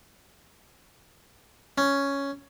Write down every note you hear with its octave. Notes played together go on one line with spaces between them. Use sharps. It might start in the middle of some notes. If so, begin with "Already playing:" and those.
C#4